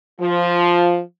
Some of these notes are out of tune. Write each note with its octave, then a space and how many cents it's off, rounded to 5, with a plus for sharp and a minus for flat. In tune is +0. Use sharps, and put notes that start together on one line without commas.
F3 +0 F4 +5